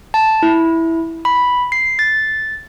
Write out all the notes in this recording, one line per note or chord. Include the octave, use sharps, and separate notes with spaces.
A5
E4
B5
C7
A6